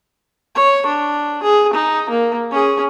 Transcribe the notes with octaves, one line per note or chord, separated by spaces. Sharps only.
C#5
D4
G#4
D#4
A#3
C#4 G#4